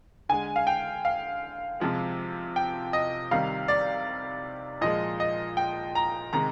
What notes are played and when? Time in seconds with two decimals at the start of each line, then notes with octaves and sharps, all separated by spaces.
0.29 D3 G#3 G#5
0.56 F5
0.67 G5
1.05 F5
1.80 C3 F3 G#3
2.56 G5
2.93 D#5
3.31 C3 D#3 G3 F5
3.68 D5
4.81 A#2 F3 G#3 D#5
5.20 D#5
5.57 G5
5.95 A#5
6.33 C3 D#3 G#3 A#5